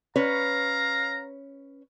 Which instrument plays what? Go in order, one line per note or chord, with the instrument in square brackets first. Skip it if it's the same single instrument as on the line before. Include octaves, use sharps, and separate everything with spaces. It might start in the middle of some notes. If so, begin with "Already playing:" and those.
[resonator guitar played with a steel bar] C#4 B4 C#5 [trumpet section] F5 A#5